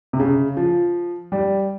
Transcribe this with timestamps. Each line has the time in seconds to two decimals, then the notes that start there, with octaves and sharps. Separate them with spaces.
0.13 C3
0.19 C#3
0.57 F3
1.32 G3